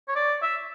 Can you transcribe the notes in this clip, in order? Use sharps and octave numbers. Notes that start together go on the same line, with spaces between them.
C#5
D5
E5